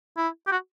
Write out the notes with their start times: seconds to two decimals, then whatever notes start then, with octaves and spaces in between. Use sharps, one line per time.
0.17 E4
0.47 G4
0.52 F#4